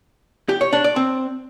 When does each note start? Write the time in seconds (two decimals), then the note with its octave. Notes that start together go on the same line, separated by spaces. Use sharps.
0.49 G4
0.61 C#5
0.73 D4
0.84 D5
0.96 C4